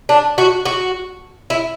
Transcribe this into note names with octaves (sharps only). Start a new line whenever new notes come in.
D4
F#4
F#4
E4